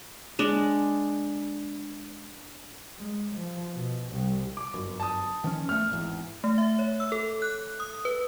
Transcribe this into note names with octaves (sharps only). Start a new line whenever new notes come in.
G#3 D4
G#3
F3
B2
C2
D6
G1 F#2
A5 D#6
D#3 F3 C#4
E2 A3 F6
G#1 E2
A3
E5
C#5
E6
A4
F#6
D#6
B4